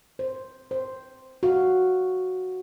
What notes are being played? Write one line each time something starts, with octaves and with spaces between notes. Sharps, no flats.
C5
C5
F#4 F5